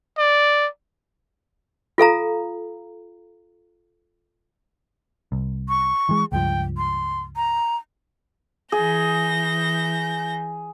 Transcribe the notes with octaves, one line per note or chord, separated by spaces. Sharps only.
D5
F4 A4 F5 A#5
C2
C#6
E3 G#3
C#2 G2 F3 G5
C6
A#5
E3 G#4 G6 A#6